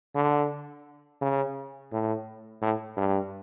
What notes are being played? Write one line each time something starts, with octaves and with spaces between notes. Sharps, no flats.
D3
C#3
A2
A2
G2